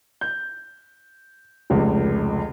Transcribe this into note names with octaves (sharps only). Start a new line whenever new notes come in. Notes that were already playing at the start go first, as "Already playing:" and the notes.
G6
F1 C#2